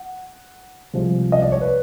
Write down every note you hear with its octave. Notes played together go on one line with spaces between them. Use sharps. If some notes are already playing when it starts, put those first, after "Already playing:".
Already playing: F#5
C2 C3 F3 G#3
D#5
D5
C#5
B4